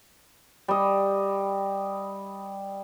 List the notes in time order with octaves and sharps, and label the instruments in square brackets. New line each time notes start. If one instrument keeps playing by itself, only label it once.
[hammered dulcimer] G3 D#5